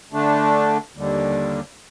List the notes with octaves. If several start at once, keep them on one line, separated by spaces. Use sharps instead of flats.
D3 A3 D4
D#2 D3 G3